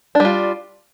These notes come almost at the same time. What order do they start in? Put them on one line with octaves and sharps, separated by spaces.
D4 G3 F4